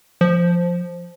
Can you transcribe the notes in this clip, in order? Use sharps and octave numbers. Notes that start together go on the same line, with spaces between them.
F3